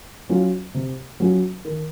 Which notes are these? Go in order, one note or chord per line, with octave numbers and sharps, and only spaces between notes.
F#3 C#4 F4
C3
F#3 C#4 F4
D#3